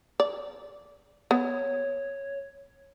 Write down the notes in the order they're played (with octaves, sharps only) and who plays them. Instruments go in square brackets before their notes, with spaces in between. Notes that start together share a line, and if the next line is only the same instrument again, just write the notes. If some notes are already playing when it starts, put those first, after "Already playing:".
[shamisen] D5
[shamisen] B3 [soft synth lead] C#5